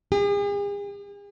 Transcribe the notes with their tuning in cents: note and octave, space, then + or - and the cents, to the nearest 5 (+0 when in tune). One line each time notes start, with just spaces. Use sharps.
G#4 -45